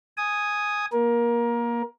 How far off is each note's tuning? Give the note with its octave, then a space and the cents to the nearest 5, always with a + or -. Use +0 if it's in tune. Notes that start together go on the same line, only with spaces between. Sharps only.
G#5 +0 D#6 +0
A#3 +20 A#4 +20